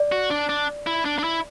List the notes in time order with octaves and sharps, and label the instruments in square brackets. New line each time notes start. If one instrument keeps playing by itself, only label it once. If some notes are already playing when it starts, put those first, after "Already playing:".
Already playing: [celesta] D5
[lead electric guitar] F#4
D4
D4
E4
D4
D4
E4